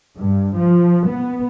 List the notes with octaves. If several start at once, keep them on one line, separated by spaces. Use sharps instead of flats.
G2
F3
B3